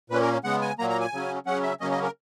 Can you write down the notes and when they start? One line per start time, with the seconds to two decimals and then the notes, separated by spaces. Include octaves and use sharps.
0.10 A#2 A#3 C#4 B4
0.22 A#4
0.44 C#3 G#3 B3 F#5
0.62 G#5
0.79 A#2 F#3 A#3 A#5
0.90 A#5
1.00 G#5
1.13 C#3 F#3 C#4
1.46 C#3 F#3 C#4 F#5
1.63 E5
1.80 C#3 F#3 A#3 C#4 D#5
1.92 D#5
2.03 A#4